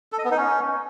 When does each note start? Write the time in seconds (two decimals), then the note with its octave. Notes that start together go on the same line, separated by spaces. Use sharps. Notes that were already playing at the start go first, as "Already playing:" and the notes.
0.12 A4
0.19 D#5
0.25 B3
0.31 D#4
0.37 C#4